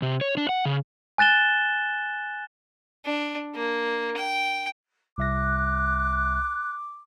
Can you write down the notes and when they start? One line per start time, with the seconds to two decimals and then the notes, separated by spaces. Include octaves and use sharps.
0.02 C3
0.21 C#5
0.37 D4
0.49 F#5
0.65 C#3
1.18 G#5 F#6 A6 E7 G7
3.06 D4
3.55 A#3
4.17 G5
5.18 C2 E5 D6 F#6 A#6